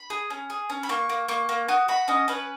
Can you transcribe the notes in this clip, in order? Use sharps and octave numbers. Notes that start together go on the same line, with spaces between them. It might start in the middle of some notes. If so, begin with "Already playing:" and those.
Already playing: B5
G#4
C#4
G#4
C#4
B5
A#3 C#6
A#3
A#3 C#6
A#3
F#4 D#6
F#4 B5
C#4 D#5
C#4 B4